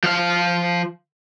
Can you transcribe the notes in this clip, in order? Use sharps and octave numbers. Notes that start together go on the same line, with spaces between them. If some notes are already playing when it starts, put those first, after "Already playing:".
F3 F5